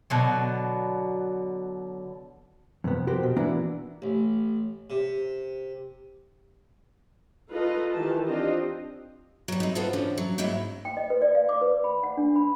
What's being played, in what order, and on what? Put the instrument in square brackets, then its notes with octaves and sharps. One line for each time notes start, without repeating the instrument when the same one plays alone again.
[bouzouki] B2 D3 F#3
[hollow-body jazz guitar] F2 C3 B3
F#4 G4 A#4 C5
B2
E3 A#3 B3 D4 E4 F#4
[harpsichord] A1
C3
[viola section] D#4 F4 A4 B4 D#5
D#3 E3 G4 A5
C4 D4 F4 G4 D#5
[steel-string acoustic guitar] F#3 G3
C4 D#4
B3 F4 F#4 A4 B4 C5
D3 E3 F3 C#4
F#3
G#2 F#3 G#3 C#4 E4
[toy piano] G5
D#5
B4
D5
F5
D6
B4
B5
F#5
D4
B5